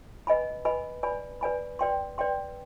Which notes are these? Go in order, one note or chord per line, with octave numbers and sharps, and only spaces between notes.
B4 D#5 G#5 B5
B4 D#5 G#5 B5
B4 D5 G#5 B5
B4 D5 G#5 B5
B4 D5 G5 C6
B4 D5 G5 C6